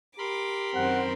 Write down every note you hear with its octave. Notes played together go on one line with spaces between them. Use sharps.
G4 A#4 B5 C6 D6
F#2 D#3 C4 F#5